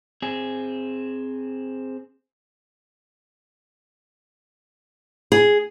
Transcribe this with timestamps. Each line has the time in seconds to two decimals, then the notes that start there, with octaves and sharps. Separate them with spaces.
0.22 C4 G#4
5.32 G#4